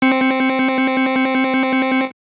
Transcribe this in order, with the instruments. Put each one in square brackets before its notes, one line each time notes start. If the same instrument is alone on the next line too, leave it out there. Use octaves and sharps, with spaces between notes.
[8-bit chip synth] C4 C#7